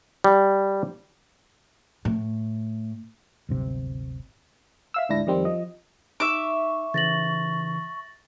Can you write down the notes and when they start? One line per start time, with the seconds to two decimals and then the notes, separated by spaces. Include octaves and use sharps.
0.24 G3
2.05 A2
3.49 D1 G1 C3
4.94 E5 F5 E6
5.09 D2 G#2 D4 E4 A#6
5.27 F2 D#3 G3 C4
5.45 F3 D#5
6.20 D#4 E5 C#6 D6
6.94 C#3 E3 A6 A#6 F#7